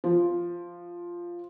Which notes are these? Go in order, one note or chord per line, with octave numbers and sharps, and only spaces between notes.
F3